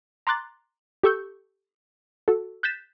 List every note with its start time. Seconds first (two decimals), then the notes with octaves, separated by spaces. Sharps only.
0.27 A#5 C6 D6 F#6 A6
1.03 G4 A4 C#6 E6 G6
2.28 F#4 A4
2.63 F#6 G6 A6 B6 E7